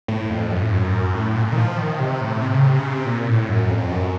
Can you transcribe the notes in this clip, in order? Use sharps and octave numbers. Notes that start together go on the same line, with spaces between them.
A2
F2
F#2
A2
F#2
A2
A#2
D#3
F3
D#3
C3
A2
C3
C#3
C3
C#3
C3
A#2
A2
F#2
F2
F#2